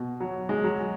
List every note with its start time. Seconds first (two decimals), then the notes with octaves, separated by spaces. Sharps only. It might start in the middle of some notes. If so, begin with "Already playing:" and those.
Already playing: B2
0.20 F#3
0.49 G#3
0.64 F#3